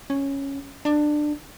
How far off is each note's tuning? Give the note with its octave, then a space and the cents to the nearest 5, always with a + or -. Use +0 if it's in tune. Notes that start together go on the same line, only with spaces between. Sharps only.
C#4 -5
D4 +20